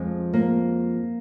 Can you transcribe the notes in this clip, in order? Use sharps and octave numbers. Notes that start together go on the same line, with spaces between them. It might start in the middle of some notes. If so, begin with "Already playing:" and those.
Already playing: F2 F3 G#3
A#3